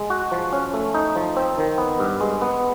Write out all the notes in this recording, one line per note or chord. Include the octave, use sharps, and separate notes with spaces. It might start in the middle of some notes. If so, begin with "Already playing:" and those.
Already playing: G#3
F#4
F3
C#4
A3
D#4
F3
C4
D#3
B3
G2
G#3
B3